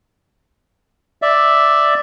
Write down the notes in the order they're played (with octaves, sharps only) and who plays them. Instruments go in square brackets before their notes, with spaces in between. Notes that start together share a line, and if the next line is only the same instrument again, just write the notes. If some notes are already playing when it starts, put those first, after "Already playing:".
[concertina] D5 E5